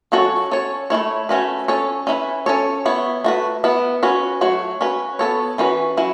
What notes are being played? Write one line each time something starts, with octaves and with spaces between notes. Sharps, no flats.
F#3 C#4 F#4 A4 C#5
C#4 A4 C#5
A3 C#4 E4 C#5
A3 C#4 F#4 B4
C#4 A4 C#5
C#4 E4 B4
C#4 A4 C#5
B3 E4 C#5
A3 F#4 B4
B3 E4 B4
C#4 F#4 B4
F#3 A3 F#4 C#5
C#4 F#4 B4
B3 A4 C#5
E3 C#4 F#4 B4
F#3 C#4 E4